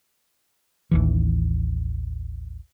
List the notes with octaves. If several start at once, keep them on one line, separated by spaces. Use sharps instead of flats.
A1 D#2 E3